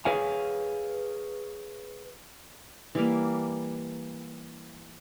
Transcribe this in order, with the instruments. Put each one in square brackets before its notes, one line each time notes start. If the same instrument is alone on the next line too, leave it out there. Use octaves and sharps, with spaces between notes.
[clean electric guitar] G#4 B4 C#5 F5 F#5 G#5
[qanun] E3 G3 A#3